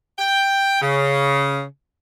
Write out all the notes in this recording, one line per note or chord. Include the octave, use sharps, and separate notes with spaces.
G5
C#3